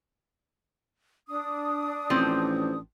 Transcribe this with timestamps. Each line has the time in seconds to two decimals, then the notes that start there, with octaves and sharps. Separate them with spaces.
1.29 D4 D#6
2.10 A1 F3 C4